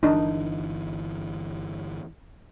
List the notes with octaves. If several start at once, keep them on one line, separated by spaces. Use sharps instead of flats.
G1 E3 D4 D#4